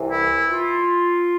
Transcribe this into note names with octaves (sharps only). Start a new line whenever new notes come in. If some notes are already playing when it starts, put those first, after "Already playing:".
Already playing: C2 C3 E3
E4
F4